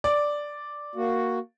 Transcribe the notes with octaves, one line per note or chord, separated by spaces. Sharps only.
D5
A#3 F#4